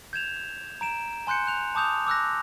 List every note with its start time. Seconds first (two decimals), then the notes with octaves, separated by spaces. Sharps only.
0.13 G6 G#6 E7 F7
0.81 A#5 D7 E7
1.27 G#5 C6 F#6 G6 C#7
1.47 F#6 F7
1.75 A5 D6 D#6 G6 F7
2.07 D6 E6 F#6 A#6